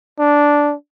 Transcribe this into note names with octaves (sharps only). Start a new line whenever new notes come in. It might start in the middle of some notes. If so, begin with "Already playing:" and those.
D4